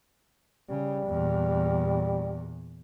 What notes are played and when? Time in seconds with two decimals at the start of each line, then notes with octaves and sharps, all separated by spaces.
0.70 C#3 G3
1.07 E2 A#2